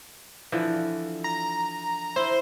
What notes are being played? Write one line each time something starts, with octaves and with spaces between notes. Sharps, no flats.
D3 E3 F3
A#5
E4 C5